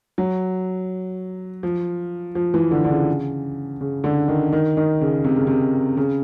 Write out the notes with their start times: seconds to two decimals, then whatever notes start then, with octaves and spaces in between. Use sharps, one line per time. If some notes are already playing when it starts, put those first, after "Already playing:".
0.18 F#3
1.63 F3
2.35 F3
2.54 E3
2.71 D3
2.85 D3
2.90 C#3
3.81 C#3
4.04 D3
4.28 D#3
4.53 D#3
4.77 D#3
5.01 C#3
5.24 C3
5.36 C#3
5.47 C3
5.97 C#3